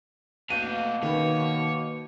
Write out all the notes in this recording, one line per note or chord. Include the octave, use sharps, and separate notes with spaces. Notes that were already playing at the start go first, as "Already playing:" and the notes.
B2 A3 A#3 F5 F#6 G6 D#7
D#3 B4 C#5